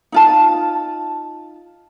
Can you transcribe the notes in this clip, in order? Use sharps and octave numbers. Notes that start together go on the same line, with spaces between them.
D#4 F4 A5